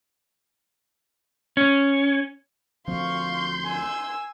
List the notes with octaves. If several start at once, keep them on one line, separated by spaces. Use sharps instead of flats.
C#4
D2 F3 C4 F5 C6 C#6 G6
G#5 E6